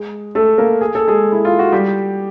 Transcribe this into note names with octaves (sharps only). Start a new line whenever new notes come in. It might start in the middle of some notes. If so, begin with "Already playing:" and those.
Already playing: G#3
A3 A4
A#3 A#4
G#4
A4
G#3 G#4
E4
F4
F#4
G3 G4